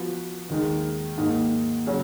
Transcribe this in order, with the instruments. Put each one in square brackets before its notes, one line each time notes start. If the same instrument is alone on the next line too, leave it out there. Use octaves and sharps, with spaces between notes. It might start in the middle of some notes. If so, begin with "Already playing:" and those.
Already playing: [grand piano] F3 B3 F#4 B4
D#2 D#3 G#3
G#2 D#3 A#3 D#4
C#3 F#3 C#4